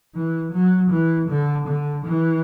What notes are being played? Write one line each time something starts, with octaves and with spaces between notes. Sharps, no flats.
E3
F#3
E3
D3
D3
E3